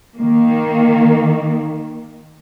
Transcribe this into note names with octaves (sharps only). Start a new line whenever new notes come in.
D#3 A#3